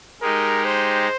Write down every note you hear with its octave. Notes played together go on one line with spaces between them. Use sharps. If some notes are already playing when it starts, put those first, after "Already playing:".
G#3 D#4 G4 A#4
C5